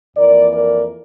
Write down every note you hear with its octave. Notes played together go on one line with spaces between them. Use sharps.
F2 E3 A#3 A#4 D5
A#4 D5